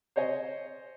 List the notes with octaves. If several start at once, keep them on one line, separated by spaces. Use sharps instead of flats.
C5 C#5 D#5 G#5